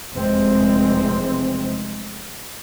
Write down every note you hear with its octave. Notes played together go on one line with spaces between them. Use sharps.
F1 E2 C3 G#3 C4